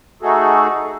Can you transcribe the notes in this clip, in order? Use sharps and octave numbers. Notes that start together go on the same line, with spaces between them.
A3 D#4 F#4 G#4 A4